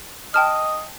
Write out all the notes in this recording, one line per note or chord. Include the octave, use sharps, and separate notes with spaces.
D#5 G5 A5 F6